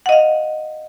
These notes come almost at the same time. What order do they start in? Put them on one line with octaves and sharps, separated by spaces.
F#5 D#5 F5